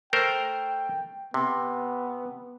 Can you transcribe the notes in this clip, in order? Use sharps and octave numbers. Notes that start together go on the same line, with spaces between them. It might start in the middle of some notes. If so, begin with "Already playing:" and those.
A3 A#4 C5 G5
C3 B3